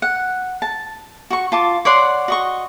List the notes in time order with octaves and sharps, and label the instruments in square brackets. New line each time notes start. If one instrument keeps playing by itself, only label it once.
[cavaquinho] F#5
A5
F#4 C#6
F4 A5 D6
C#5 D5 F#5 C6
F#4 D#5 C#6